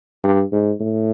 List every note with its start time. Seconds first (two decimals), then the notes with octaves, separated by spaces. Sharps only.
0.23 G2
0.52 G#2
0.81 A2